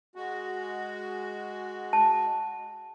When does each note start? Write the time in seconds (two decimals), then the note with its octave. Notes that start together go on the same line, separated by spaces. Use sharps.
0.16 G#3 F#4
1.93 A5